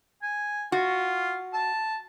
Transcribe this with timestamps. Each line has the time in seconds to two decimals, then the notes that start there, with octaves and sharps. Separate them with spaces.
0.22 G#5
0.72 F4 F#4
1.53 A5